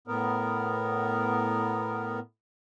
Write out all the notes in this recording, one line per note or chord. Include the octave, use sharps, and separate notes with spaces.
A2 B3 A#4